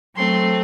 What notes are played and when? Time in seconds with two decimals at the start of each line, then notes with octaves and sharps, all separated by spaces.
0.16 F#3 A3 C4 C6